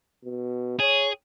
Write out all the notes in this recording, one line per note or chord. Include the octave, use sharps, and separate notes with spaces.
B2
G#4 C#5